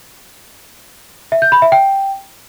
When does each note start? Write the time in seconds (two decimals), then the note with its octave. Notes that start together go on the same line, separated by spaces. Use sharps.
1.32 E5
1.42 G6
1.52 B5
1.62 E5
1.72 G5